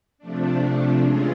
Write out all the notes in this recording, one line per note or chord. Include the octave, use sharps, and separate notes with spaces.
C3 F3 A3 D4
E3 G#3 C#4 F4 G#4